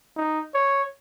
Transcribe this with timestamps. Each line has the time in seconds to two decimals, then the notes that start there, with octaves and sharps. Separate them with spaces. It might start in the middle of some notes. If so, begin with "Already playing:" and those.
0.17 D#4
0.54 C#5